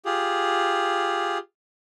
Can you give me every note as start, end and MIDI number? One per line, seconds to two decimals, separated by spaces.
0.05 1.38 65
0.05 1.38 67
0.05 1.38 68